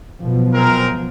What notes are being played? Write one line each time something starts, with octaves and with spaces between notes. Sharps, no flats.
B2 F3 F#3
G#3 C4 A#4